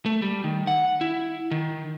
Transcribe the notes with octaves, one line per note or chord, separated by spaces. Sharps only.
A3
G3
D#3
F#5
E4
D#3